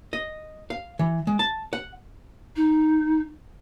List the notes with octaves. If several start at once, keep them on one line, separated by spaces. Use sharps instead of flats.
D#5
F5
E3
G#3
A5
F#5
D#4